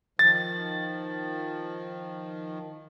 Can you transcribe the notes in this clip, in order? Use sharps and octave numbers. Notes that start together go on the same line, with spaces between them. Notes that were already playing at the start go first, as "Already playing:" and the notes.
D#3 F3 A6